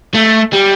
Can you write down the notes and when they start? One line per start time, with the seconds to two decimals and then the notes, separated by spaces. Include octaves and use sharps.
0.14 A3
0.53 G3